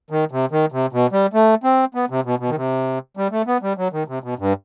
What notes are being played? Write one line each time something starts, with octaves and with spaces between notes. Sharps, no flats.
D#3
C3
D#3
C3
B2
G3
A3
C4
B3
C3
B2
B2
D#3
C3
G3
A3
B3
G3
F#3
D#3
C3
B2
G2